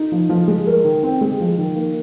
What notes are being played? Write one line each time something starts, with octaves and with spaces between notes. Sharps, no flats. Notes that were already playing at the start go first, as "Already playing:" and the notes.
Already playing: D#4
F3
F3
G#3
A#4
D#3
C4
G#3
F3
D#3
A#3